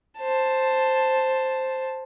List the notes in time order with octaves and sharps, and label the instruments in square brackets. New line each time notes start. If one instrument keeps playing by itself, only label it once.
[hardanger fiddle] C5 A5